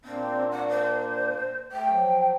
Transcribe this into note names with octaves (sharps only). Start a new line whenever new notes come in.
A#2 A#3 C4 D4
F#5
C5
A3 G5
F3 F#3